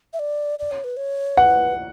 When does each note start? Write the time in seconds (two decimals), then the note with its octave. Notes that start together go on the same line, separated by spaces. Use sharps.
0.13 E5
0.19 D5
0.59 D5
0.71 C#5
0.84 B4
0.97 C#5
1.37 B4 F#5